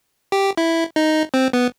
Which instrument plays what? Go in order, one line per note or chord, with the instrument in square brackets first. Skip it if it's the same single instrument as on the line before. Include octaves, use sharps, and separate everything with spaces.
[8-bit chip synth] G4
E4
D#4
C4
B3